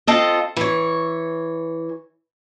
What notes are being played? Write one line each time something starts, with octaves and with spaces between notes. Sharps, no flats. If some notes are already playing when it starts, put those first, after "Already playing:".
C4 F4 A4 D#5
E3 C#5